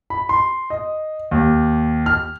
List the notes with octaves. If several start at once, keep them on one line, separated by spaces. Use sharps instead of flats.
B5
C6
D#5
D#2
F6